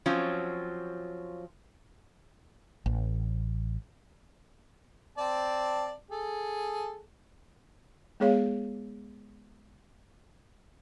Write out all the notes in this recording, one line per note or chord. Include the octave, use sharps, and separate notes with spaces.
F3 F#3 C4 C#4 F4
A1
C4 D5 A5
G#4 A4
G#3 B3 G#4 C#5 F5